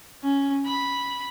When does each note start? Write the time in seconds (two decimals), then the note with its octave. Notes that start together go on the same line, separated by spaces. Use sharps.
0.23 C#4
0.66 B5